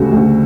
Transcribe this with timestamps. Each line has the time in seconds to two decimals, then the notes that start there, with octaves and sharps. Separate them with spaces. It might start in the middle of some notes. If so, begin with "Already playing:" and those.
Already playing: D2 C#3 G3 F#4 A4
0.12 D2